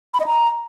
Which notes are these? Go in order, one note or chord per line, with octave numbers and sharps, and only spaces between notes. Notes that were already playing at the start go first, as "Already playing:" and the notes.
B5
D#5
A#5